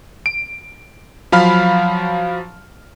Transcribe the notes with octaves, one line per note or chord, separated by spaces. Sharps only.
D7
F3 F#3 F5 B5 F6